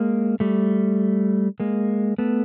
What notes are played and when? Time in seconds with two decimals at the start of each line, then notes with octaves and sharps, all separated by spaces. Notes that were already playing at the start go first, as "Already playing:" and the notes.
Already playing: G#3 A#3
0.40 G3 A3
1.60 G#3 A#3
2.18 A3 B3